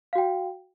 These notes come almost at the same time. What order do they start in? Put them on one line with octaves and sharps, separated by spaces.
F5 F#4 G5